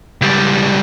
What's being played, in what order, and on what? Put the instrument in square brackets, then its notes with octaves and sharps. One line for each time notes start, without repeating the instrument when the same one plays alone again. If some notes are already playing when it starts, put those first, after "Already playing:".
[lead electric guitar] C#2 G3